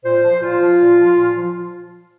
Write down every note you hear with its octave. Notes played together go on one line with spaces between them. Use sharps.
A#2 C5
F3
A#2 F4
F3
A#2
F3
A#2
F3